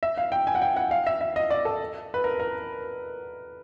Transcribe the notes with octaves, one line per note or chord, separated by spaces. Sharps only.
E5
F5
G5
G#5
F#5
G5
F#5
F5
E5
E5
D#5
D5
A4
B4
A#4
A#4